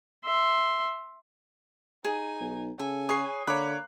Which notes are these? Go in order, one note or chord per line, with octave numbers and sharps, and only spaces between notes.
E5 C6
D#4 G#4 G#5
B1
C#3 A4 G#5
G#4 B4 C#5 D#6 C7
D3 A#3 C#5 B5 D6 F#6